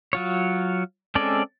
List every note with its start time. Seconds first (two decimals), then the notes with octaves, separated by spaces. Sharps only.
0.13 F#3 F4 C#5
1.15 G#3 C4 C#4 A4 D5